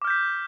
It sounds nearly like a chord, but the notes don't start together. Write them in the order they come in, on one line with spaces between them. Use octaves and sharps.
D6 F6 G6 B6